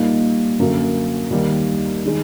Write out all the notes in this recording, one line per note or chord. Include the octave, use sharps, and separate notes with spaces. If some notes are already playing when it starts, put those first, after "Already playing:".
Already playing: A#2 G3 A#3 D#4
F#2 D3 F#3 A#3
D#2 D#3 G3 A#3
D#3 G#3